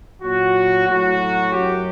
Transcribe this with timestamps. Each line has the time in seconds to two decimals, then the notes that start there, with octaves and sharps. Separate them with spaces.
0.22 A#2 F#3 F#4
0.87 A2 F#3 F#4
1.51 F#2 F#3 G4